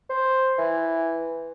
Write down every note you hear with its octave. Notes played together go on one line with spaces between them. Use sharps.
C5
E3